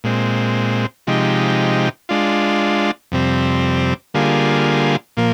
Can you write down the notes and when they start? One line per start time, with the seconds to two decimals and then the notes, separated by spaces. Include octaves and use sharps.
0.04 A#2 G#3 C4
1.07 C3 F3 G#3 D#4 G4
2.09 G#3 D4 F4
3.12 F2 C3 G3 C4
4.14 D3 G3 A#3 F4 G#4
5.17 A#2 F3 A#3